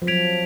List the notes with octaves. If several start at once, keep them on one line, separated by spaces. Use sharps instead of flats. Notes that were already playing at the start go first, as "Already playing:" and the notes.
F3
F#3 G#6 B6 D7 F7